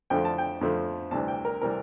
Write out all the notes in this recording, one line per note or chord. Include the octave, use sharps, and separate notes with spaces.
F2 D3 F3 A3 G5
A5
G5
F2 D3 F3 A3
D2 C3 E3 G3 A5
G5
A#4
C3 E3 G3 A#4